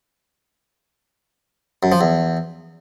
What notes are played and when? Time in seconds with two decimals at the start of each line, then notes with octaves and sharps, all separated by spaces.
1.83 F#2
1.92 F3
2.01 E2